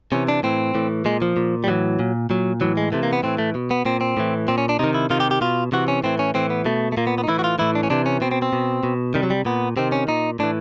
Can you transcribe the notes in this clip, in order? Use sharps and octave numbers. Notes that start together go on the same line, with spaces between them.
C3 E3 C#4
D4
A2 E3 C4
A2 E3
A#2 G#3
F3
A#2
G3
A2 E3 F#3
A#2
A#2 F#3
A2 E3 F#3
G#3
C3 E3 A3
A#3
B3
A2 E3 C4
A3
B2
B3
A#2 C4
C4
A2 E3
A#2 C4
C#4
D4
C3 D#3 D#4
E4
C3 D#3 F4
G4
G4
B2 F4
C3 E3 F#4
C#4
A2 E3 C4
C#4
A2 E3 C4
B3
B2 A3
A3
A#2 A#3
B3
B3
D#4
A2 E3 E4
F#4
F4
A2 E3 E4
D4
C#4
C3 E3 D4
C#4
B2 C4
C4
C4
B2
B2
C3 D#3 G3
F#3
G3
A#2 B3
C3 D#3 C4
C#4
A#2 D#4
A2 E3 D4